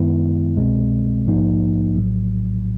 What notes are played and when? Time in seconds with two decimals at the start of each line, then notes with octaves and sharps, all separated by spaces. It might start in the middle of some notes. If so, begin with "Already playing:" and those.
Already playing: F#2 D#3 G#3 B3 E4
0.57 C2 B2 G#3 C4
1.26 A#1 G#2 F3 A#3 D#4
1.96 A#1 A2 F#3